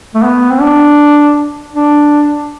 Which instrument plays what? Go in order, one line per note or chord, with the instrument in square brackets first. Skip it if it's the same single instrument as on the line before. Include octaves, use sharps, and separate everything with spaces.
[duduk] A3
B3
C4
D4
D4